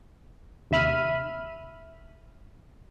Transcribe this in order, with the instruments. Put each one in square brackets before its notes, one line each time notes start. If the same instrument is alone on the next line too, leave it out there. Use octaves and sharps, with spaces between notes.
[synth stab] D#2 C3 E5 B5 F6 D#7